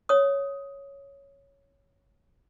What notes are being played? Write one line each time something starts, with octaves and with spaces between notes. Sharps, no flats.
C#5 D#6